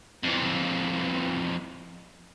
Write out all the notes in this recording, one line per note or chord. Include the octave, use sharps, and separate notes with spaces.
F2 E3